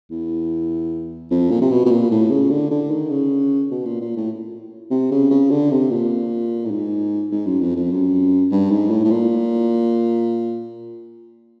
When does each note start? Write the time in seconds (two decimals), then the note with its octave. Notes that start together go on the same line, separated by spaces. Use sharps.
0.11 E2
1.31 F2
1.51 A#2
1.62 C3
1.71 B2
1.86 B2
1.91 A#2
2.11 A2
2.31 C#3
2.50 D3
2.71 D3
2.91 D#3
3.10 C#3
3.71 B2
3.86 A#2
4.01 A#2
4.16 A2
4.91 C3
5.11 C#3
5.30 C#3
5.51 D3
5.71 C3
5.91 A#2
6.65 A2
6.71 G#2
7.31 G#2
7.46 F#2
7.61 F2
7.76 F2
7.92 F#2
8.51 G2
8.70 G#2
8.90 A2
9.04 A2
9.11 A#2